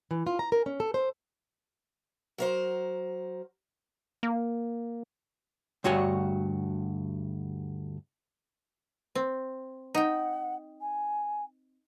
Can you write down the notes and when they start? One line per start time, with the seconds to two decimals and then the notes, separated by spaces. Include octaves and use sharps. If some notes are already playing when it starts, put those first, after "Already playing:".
0.11 E3
0.27 F4
0.39 A#5
0.52 A#4
0.66 C#4
0.80 A4
0.94 C5
2.38 F#3 A#4 C5
4.23 A#3
5.84 D2 G2 F#4 C#5 G#5
9.15 C4
9.95 D#4 F#5 G5
10.80 G#5